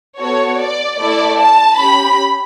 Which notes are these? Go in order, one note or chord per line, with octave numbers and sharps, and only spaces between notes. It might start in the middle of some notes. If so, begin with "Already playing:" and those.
B3 F#4 A4 C#5
D5
A3 E4 A4 D5
A5
C#4 G4 B5